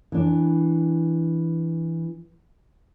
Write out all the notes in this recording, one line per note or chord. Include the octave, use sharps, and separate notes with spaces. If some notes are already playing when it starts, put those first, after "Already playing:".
E3 D4